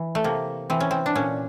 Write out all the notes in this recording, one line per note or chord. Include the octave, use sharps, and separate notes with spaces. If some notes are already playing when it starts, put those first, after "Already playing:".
Already playing: E3
A3
C3 A#3
E3 C4
C#4
C4
D4
A#2 C#4